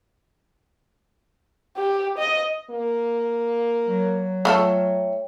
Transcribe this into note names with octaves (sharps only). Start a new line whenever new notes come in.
G4
D#5
A#3
F#3
A3 F4 A4 C#5 E5 G5